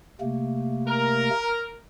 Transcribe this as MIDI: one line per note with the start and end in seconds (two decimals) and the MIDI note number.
0.21 1.30 48
0.21 1.30 57
0.21 1.30 58
0.87 1.77 70